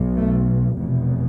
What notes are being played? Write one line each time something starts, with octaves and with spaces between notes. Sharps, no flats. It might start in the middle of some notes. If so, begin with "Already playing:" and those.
Already playing: B1 B2
A3
F1 E2 B2